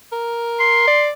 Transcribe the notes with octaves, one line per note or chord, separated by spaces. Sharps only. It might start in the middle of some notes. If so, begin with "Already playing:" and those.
A#4
C6
D5